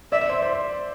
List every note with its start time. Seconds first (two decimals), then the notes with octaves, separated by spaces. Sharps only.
0.12 D5 E5
0.29 C5
0.42 C5